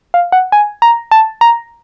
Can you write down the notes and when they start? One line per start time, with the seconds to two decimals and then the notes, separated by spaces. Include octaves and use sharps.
0.14 F5
0.32 F#5
0.52 G#5
0.82 A#5
1.11 A5
1.41 A#5